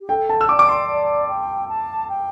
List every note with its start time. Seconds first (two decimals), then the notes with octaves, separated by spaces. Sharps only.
0.01 G4
0.09 A4 G5
0.29 A5
0.41 E6
0.49 D5 D6
0.59 D6
0.69 C6
0.89 D5
1.29 G5
1.69 A5
2.09 G5